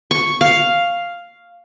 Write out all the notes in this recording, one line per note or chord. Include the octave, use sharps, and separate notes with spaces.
C#6
F5